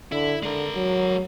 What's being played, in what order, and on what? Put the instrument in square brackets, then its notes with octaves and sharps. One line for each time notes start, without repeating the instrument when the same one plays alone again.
[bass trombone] D3 [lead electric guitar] E4
[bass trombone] D3 [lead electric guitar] G#3 A#4
[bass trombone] F#3